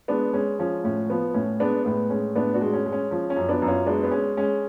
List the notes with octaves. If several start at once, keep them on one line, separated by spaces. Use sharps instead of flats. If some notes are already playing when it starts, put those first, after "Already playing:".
G#3 B3 D4
G#3 C#4
F3 C#4
A2 C#4
F3 B3
A2 C#4
G#3 B3 D4
A2 B3
G#3 C#4
A2 B3 D4
D4 F#4
G#3
C#4
G#3
C#4
F3 C#4
C#4
F#2
B3 D4
F#2
C#4 F4
G#3 B3 D4
B3
G#3 C#4
G#3 C#4